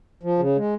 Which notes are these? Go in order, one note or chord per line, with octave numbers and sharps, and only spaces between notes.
F3
C#3
G#3